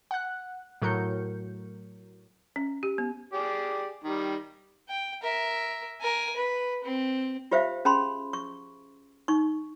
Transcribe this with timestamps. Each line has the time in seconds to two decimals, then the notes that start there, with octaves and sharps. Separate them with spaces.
0.11 F#5 F#6
0.82 A2 F#3 F#4 A#4 G6 C#7
2.56 C#4
2.83 G4
2.98 B3
3.33 G4 G#4 D5
4.04 D#3 G3
4.89 G5
5.22 A#4 E5
6.01 A#4 G#5
6.36 B4
6.84 C4
7.51 F4 G4 C5 E5 F5
7.85 C#4 G#4 A5 B5 C6
8.33 C#6
9.28 D#4 C#6